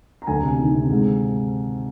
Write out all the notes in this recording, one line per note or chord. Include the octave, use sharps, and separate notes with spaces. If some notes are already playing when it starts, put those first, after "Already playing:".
A#5
D2 G#5
C3
D#3
C3
G#2